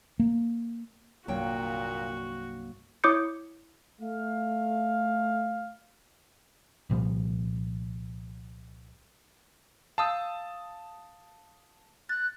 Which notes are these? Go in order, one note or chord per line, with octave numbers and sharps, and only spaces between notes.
A#3
C2 G2 A#2 F#3 A#3 F#4 G5
E4 C#5 D6 D#6 G6 C#7
A3 F5
C2 A#2 F3 G3
F5 A5 D#6 E6 G6
F#6 A6